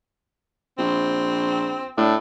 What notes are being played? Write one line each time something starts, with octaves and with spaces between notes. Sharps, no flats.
A#1 C4
A2 D4